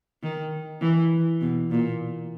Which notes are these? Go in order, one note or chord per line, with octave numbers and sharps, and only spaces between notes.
D#3
E3
B2
A#2